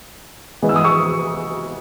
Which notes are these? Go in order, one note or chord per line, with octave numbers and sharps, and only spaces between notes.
E3 G#3 B3
E6
D#6
C#6 E6